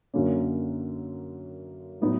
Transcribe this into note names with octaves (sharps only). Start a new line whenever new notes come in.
F#2 D3 F#3 A#3 C#4
A2 F#3 B3 D#4